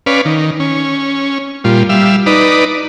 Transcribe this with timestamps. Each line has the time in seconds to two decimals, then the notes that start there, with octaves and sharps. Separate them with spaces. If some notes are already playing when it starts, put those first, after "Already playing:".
0.06 C#4 B4 D5 F5
0.25 D#3
0.60 C#4
1.64 A#2 G3 F4
1.89 G3 E5 F5
2.26 D#4 B4 D5